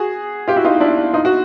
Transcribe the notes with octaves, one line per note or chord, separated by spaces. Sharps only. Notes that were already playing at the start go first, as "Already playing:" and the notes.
Already playing: F#4 G#4
F4 G4
E4 F#4
D#4 F4
D4 E4
D#4 F4
F#4